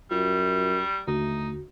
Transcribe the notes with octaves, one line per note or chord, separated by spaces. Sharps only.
F#2 G3 F4
D#2 D3 A3 D#4 F#4